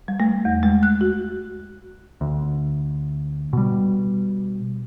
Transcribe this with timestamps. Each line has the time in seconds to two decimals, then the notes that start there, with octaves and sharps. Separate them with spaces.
0.08 G3
0.20 A3
0.45 E2
0.63 G#3
0.83 F#6
1.01 F#4
2.21 D2
3.53 B2 G3